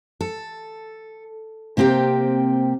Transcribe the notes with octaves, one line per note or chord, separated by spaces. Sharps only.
A4
C3 A#3 C4 G4 G5